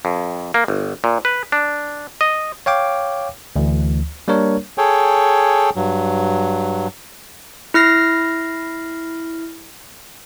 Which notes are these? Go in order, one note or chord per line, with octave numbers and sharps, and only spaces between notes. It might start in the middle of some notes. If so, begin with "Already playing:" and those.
F2
A#3
G1
A#2
B4
D4
D#5
C#5 F5 G5 D6
D2 E3
G3 A#3 D4 A#4 C#5
G#4 A4 C#5 G5
G2 F#3
E4 F6 A#6 C7